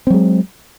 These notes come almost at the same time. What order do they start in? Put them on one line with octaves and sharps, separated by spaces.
C4 F#3 G#3